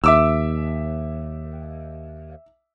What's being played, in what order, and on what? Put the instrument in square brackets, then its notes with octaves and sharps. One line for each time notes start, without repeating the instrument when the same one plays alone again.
[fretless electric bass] D#2 [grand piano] E5 D6 E6